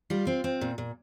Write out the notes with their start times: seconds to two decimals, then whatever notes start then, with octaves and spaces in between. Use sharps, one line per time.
0.10 G3 F4
0.27 C4
0.44 C4
0.61 A#2
0.78 A#2